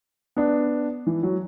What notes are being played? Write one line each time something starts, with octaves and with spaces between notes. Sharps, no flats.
B3 D4
E3
F#3